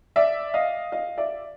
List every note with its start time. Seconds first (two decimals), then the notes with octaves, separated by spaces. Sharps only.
0.16 D5 E5
0.54 D#5 F5
0.92 D#5 F5
1.18 D5 E5